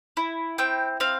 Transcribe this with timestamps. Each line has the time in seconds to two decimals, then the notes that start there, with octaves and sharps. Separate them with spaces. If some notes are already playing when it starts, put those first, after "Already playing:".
0.17 E4
0.58 C4 G5
1.00 C4 F5